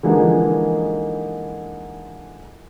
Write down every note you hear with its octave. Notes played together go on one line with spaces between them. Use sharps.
D3 E3 F3 G#3 A#3 D#4